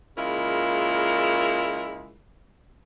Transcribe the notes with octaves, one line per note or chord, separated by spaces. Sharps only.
A#2 C#3 G#3 E4 F4 A#4